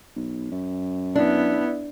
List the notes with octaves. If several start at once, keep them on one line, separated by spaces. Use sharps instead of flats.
B1
F#2
B3 D4 E4